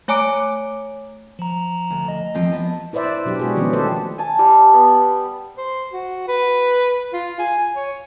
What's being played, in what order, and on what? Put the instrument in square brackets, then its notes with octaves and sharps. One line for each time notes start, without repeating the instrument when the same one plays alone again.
[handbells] A3 C#5 G#5 A#5 D6 D7
[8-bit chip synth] F3 A#5
[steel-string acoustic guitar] D2
[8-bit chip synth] D#5
[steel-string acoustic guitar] E2 F3 C4
B3 A5
[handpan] E4 B4 C5 D5 E5
B2 F#3 D4 G4
G#3 F#4 G#4
D#3 F3 G3 G#3 B3 C#4
D#3 A3 G4 A4 B4 C5
[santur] G#5 A5
G3
B3
[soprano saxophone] C5
F#4
B4
F4
G#5
C#5